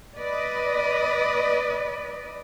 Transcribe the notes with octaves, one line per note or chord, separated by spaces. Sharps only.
B4 D5 D#5